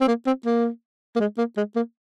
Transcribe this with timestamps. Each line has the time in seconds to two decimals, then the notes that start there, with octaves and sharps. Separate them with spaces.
0.01 C4
0.07 A#3
0.26 C4
0.45 A#3
1.16 A#3
1.20 G#3
1.38 A#3
1.57 G#3
1.76 A#3